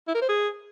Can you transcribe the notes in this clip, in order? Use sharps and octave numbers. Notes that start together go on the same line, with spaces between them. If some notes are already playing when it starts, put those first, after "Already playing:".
E4
A#4
C5
G#4